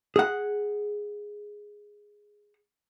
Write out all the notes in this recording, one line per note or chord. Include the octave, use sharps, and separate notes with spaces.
G#4 F#5